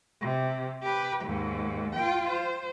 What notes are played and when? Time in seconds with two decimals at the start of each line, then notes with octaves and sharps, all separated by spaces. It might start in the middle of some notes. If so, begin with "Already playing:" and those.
0.21 C3
0.83 G4 B4
1.24 D#2 G#2
1.95 F4 G5
2.29 C5